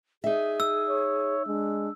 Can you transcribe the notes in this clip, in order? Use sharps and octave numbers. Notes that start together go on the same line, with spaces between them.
D#4 G#4 E5
E6
C#5
G#3 D4